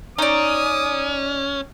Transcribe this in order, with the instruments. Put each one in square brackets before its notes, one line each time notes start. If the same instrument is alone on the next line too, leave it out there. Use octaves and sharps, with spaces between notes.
[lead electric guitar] C#4 [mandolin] D#4 D5 [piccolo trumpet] D#6